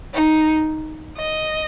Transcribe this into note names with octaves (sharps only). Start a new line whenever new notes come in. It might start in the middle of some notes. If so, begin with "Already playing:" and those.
D#4
D#5